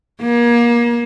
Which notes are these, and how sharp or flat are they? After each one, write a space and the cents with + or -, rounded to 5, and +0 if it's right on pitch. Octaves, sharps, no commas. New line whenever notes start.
A#3 +30